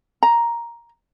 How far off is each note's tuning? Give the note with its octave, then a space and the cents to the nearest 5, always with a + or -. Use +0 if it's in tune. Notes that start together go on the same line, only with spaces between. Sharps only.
A#5 +5